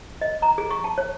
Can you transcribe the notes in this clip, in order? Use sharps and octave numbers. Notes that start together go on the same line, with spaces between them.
D#5
A#5
G#4
C#6
A5
C#5